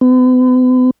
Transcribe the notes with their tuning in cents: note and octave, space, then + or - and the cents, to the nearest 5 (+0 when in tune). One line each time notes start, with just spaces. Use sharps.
B3 +45